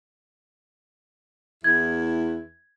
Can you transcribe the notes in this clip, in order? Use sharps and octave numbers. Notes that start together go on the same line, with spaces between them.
E2 E4 G#6